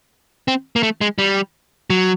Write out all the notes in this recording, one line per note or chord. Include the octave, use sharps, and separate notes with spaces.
C4
A#3
A3
G#3
G3
F#3